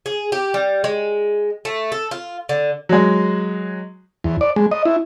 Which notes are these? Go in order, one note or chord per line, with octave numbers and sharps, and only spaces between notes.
G#4
G4
G3
G#3
A3
A4
F4
D3
F#3 G#3
E2
D5
G#3
D#5
E4